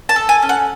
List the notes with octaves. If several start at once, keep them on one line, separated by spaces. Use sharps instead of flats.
A5
A4
G#5
C#4
F#5